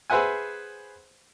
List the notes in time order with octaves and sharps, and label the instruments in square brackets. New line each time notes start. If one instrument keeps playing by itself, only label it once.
[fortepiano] G#4 B4 C5 E5 F#5 G#5